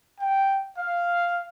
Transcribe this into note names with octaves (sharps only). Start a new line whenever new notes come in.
G5
F5